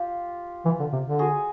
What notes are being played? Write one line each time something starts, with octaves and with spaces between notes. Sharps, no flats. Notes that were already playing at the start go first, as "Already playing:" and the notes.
Already playing: F4 G4
E3
D3
C3
D3
F#4 G#4